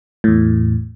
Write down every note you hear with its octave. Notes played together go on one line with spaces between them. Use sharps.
E2 A2